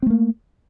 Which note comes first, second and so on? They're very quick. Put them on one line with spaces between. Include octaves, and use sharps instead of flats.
C4 A3 A#3